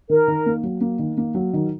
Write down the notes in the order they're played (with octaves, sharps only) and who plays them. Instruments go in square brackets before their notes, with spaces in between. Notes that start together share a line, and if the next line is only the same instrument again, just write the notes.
[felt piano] D#3 [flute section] A#4
[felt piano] D#3
A#3
F#3
A#3
D#3
A#3
F#3
D#3